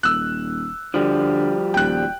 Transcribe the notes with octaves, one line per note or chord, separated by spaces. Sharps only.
D#1 E6 F#6
D3 F3 G3
D#1 G5 F#6